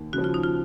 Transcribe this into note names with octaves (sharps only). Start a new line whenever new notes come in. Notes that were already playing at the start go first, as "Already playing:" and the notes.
Already playing: D#2
C#3 F3 F#4
F4
D#4
F4